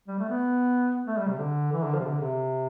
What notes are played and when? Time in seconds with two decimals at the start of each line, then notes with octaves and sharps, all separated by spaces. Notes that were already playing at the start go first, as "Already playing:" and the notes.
0.08 G3
0.19 A3
0.29 B3
1.07 A3
1.18 G3
1.28 C3
1.39 D3
1.73 E3
1.84 D3
1.95 F3
2.00 C3
2.05 D3
2.22 C3